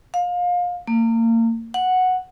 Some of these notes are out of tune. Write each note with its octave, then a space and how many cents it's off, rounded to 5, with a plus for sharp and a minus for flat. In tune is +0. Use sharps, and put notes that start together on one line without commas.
F5 +30
A#3 -35
F#5 -5